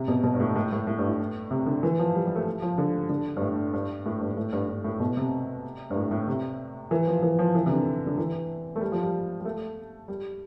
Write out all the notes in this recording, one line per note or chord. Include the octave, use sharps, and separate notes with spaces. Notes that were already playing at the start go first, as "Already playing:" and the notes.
Already playing: C3
B2
B2
G2
A2
A2
A2
A2
G2
A2
C3
D3
E3
F3
G3
G3
A3
F3
D3
D3
G2
A2
G2
A2
G2
G2
A2
G2
G2
A2
B2
C3
G2
A2
A2
C3
E3
F3
E3
F3
E3
C3
D3
D3
E3
A3
G3
F3
G3
G3
A3
G3